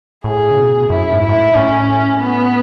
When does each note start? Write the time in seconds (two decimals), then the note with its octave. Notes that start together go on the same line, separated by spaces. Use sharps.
0.24 A2 G#4
0.51 C#3
0.57 B2
0.90 F#2 E4
1.12 G#2
1.23 E4
1.29 G#2
1.33 A2
1.55 A2 C#4
2.20 B3